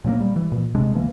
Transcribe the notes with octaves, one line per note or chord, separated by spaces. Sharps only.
A#2 F#3 A3 A#3
G3
E3
A#2
D#1 C3 G#3 D4
D2 E3 A#3